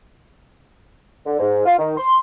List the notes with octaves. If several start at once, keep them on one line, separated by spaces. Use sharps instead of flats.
D3
G#2
F4
D#3
C6